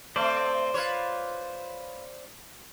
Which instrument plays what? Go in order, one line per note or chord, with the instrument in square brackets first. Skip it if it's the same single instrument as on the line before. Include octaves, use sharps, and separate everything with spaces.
[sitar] A3 C4 [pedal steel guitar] C5 D5
[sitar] F4 B4 C#5